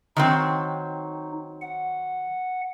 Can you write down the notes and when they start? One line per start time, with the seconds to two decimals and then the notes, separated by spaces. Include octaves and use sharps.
0.16 D#3 F#3 C4 D#4
1.62 F#5